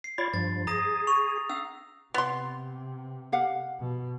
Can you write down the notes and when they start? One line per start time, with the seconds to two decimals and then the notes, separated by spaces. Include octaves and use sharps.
0.04 C7
0.18 F4 C#5 D5 B5
0.34 G2 F3 A6
0.67 G#4 A#5 D#6 A#6
1.07 C#6 F7
1.50 C#4 F5 E6
2.14 C3 B3 C6
3.32 G4 F5 F#5
3.80 B2